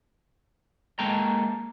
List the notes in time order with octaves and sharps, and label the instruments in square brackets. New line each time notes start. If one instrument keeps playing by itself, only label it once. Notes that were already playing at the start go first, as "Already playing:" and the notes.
[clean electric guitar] G#3 A#3 A4 G5 A#5